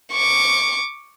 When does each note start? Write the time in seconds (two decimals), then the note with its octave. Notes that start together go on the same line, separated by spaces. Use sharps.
0.13 C#6 D6